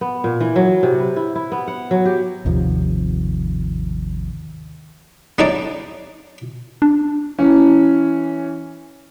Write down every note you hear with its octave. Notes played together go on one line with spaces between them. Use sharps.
B3
A#2
E3
F#3
C3
B4
E4
E4
B3
F#5
F#3
G4
G#1 D#2 C3 F3
G3 G#3 D4 D#4 C#5 D5
D4
E3 C#4